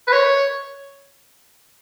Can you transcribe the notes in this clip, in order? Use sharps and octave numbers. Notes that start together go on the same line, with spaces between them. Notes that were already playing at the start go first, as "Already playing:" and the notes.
B4
C#5